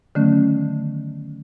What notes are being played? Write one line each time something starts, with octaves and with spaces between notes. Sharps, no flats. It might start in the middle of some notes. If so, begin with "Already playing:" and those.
D3 D#3 F#3 A3 B3 C#4